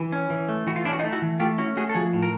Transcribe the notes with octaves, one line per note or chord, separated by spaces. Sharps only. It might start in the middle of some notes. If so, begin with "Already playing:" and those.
Already playing: E3
C#4
E3
A3
E3 F#4
F4
C#4 D4 E4
F#4
D#4 F4
A3
E4 F#4
E3
A3 F4 G4
C#4 E4 F#4
A3 F#4 G#4
A4
F3 F#4 G#4
A2
A#4